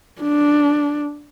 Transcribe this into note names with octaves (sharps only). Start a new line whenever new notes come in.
D4